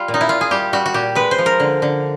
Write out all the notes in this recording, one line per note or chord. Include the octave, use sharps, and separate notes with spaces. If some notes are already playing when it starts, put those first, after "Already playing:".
Already playing: G3 F4
A#2
D#4
E4
A#2 F4
G#4
G3 G4
G3 F#4
F#4
A#2 G4
G#3 B4
C5
F3
A#4
D3
D3